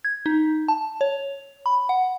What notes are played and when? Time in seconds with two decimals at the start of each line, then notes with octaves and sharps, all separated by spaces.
0.05 G#6
0.26 D#4
0.68 A5
1.01 C#5
1.66 B5
1.89 F#5